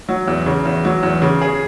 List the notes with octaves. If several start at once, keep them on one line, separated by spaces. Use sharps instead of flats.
F#3
E2
C#3
E2
F#3
E2
C#3
G#4